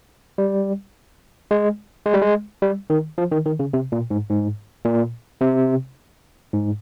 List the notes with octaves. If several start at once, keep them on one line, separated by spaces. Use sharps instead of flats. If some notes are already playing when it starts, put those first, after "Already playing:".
G3
G#3
G#3
G3
G#3
G3
D#3
F3
D#3
D#3
C#3
C3
A#2
G#2
G#2
A#2
C3
G#2